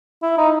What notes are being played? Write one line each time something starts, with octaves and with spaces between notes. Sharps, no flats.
E4
D#4